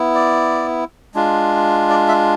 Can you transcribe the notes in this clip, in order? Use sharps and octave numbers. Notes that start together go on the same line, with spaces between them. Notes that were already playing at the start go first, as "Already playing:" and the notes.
Already playing: B3 E4
D5
G#3 D4 F4
D5
E5